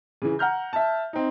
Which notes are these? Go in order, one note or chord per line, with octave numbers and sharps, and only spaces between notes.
C#3 E3
F#5 A#5 F6 G6
E5 A5
C4 D#4